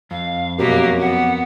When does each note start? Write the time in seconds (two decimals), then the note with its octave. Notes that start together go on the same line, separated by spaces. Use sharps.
0.11 F2 F5
0.58 F#2 B2 F#3 A#3 G4
1.00 B3 F#5